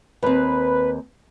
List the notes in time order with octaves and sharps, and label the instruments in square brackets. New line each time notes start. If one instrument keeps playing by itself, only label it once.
[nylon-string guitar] D#2 C4 [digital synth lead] B4